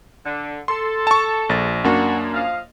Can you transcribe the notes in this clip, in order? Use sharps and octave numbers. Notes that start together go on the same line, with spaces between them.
D3
A4 C6
A5 C#6
A#1 A6
F#2 A#3 D4 F#4
F3 D#5 F5